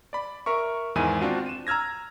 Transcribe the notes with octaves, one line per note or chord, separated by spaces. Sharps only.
D5 B5
A#4 E5 C#6
E2 G#2 D#3 E4 G#5 D#7
C4 D4 F4 F#4
D#7 E7
A#5 E6 F6 G#6 A#6